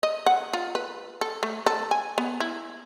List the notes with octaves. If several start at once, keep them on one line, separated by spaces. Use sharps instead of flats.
D#5
F#5
F4
B4
A4
A3
A4
G#5
B3
E4